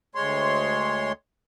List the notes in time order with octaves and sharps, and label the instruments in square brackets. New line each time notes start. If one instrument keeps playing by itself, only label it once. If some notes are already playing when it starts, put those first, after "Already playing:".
[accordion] D2 G#3 C#5 C6